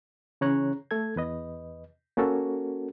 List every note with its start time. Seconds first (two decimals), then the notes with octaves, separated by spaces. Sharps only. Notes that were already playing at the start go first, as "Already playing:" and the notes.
0.41 C#3 E3 C#4 C#5 A#5 F#6
0.91 A3 A4 G#6
1.16 E2 B4 D#5
2.17 A#3 C#4 F#4 A4 A#4